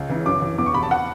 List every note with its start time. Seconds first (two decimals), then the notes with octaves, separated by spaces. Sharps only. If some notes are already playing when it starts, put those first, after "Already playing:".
Already playing: C#2
0.09 C#3 E3
0.25 F#2 D6
0.42 E3
0.58 E2 D6
0.66 C#6
0.74 B2 B5
0.83 A5
0.91 F#5